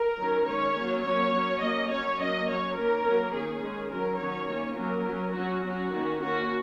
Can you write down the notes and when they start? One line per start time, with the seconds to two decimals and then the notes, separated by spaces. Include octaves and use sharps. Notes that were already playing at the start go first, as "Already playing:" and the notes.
Already playing: A#4
0.18 D#3 F#3 C#4
0.46 D#3 G#3 C#4 C#5
0.75 F#3 A#3 C#4
1.04 F#3 A#3 C#4 C#5
1.33 F#3 C#4
1.61 F#3 A#3 C#4 D#5
1.90 F#3 C#4 C#5
2.18 F#3 A#3 C#4 D#5
2.47 F#3 C#4 C#5
2.76 D#3 A#3 C#4 A#4
3.04 F#3 A#3 C#4
3.33 D#3 A#3 C#4 G#4
3.62 D#3 G#3 C#4
3.90 F#3 C#4 A#4
4.19 D#3 F#3 C#4 C#5
4.48 D#3 A#3 C#4
4.76 F#3 A#3 C#4 A#4
5.05 F#3 C#4
5.34 F#3 C#4 F#4
5.63 F#3 C#4 F#4
5.91 D#3 A#3 C#4
6.20 D#3 A#3 C#4 F#4